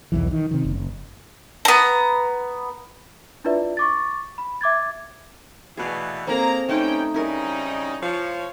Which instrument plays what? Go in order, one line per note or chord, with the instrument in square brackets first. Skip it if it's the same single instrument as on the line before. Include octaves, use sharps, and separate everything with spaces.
[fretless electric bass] B1 E2 E3
D#3
C3 D#3
F#1
[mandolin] B3 A#5
[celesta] D4 E4 F4 B4 D5 E5
C#6 D6 A6
B5
E5 D6 G#6 A6
[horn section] B2 E3 A3 [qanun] G#4 D5 F5
[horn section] A#3 A#5 [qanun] C4 G#4 A4
[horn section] G2 C#4 G5 [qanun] A3 D#4 A5
[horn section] C#3 G3 D#4 [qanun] E4 A#4
[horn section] F3 C#5